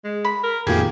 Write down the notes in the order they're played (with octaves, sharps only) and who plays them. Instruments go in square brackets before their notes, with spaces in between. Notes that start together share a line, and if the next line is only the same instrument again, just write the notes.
[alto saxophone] G#3
[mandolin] B5
[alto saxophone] A#4
[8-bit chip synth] F2 A2 A#3 [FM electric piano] D#3 F4 [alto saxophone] G4 [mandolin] G#4